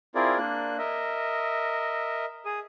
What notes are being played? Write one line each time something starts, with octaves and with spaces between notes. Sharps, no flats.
C4 E4 F4 G#4 A#4 D5
A#3 D4 F#6
A#4 D#5 E5
G#4 D#6